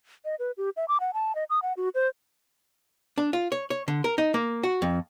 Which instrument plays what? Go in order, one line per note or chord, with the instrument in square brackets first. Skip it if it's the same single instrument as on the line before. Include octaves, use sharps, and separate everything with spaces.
[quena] D#5
B4
G4
E5
D6
F#5
A5
D#5
D#6
F#5
F#4
C5
[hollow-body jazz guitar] D4
F4
C#5
C#5
D3
A#4
D#4
A#3
F#4
F2